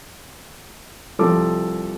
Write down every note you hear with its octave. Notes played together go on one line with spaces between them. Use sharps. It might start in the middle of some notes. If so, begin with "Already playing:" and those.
C2 F3 A4 D6